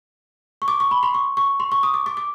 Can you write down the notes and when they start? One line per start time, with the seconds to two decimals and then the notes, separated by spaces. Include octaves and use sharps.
0.62 C#6
0.68 D6
0.80 C#6
0.91 B5
1.03 C6
1.15 C#6
1.37 C#6
1.60 C6
1.72 C#6
1.83 D#6
1.94 D6
2.06 D6
2.17 D6